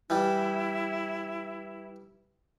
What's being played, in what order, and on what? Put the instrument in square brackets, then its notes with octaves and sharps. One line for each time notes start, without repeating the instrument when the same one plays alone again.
[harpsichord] E3 G3 [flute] E4